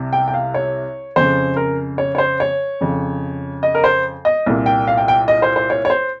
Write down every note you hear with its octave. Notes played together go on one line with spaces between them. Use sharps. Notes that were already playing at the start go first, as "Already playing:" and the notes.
Already playing: C2 C3
G5
G5
F5
C#5
F2 C#3 C5
A#4
C#5
C#5
C5
C#5
F2 C#3
D#5
A#4
C5
D#5
C2 A#2
G5
F5
G5
G5
D#5
C5
C5
C#5
C#5
C5